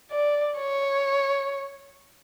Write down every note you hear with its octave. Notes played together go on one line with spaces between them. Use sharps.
D5
C#5